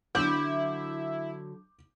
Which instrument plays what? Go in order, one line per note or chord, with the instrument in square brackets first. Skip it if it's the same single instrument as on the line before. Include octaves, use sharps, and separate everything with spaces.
[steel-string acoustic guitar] D3 F#3 [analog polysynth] E4 [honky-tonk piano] D6 G6